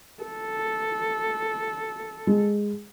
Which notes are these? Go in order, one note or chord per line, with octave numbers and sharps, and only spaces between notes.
A4
G#3